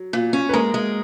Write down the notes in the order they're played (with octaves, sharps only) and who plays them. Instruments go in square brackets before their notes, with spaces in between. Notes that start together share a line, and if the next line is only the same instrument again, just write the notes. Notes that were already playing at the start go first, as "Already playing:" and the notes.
Already playing: [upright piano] F#3
[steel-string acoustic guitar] A#2
C#4
[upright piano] B4
[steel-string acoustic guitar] G#3 [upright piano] A#3 A#4
[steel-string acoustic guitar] G#3